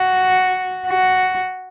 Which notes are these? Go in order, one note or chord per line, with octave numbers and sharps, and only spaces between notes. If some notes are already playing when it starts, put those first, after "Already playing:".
Already playing: F#4
F#4